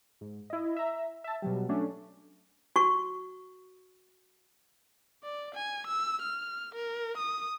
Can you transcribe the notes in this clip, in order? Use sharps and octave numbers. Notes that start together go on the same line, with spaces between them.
G#2
E4 D#5
E5 A#5
E5 A5
B2 F#3 G3
F#3 A3 C#4 D4
F#4 C#6
D5
G#5
E6
F6
A#4
D#6